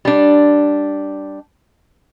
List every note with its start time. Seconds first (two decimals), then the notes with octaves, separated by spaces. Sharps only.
0.05 G3 D4